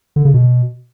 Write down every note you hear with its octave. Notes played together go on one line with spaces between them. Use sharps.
D3
C#3
B2